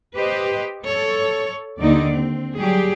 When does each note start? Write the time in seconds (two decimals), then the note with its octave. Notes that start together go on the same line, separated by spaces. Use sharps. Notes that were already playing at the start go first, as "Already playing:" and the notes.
0.16 G4 B4 C5 D#5
0.85 A4 C#5
1.79 D#2 D3 D#4 D5
2.12 C4
2.57 F#3 G3 G4 G#4